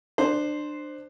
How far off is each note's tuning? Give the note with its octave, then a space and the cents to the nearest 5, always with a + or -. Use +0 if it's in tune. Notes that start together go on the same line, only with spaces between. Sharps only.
D4 +25 C5 +0